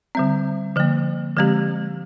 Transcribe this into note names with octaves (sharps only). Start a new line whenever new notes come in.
D3 G3 C4
D3 F3 A#3
D3 F3 G#3 C4 G4